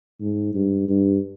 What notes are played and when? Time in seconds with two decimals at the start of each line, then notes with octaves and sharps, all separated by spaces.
0.21 G#2
0.55 G2
0.88 G2